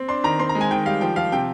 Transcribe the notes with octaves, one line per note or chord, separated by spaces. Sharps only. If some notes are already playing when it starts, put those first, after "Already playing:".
Already playing: C4
D4 C6
D#3 A#5
C4 C6
A#5
G#3
G#5
D#3 G5
G3 F5
F3 G5
F3 F5
C3 G5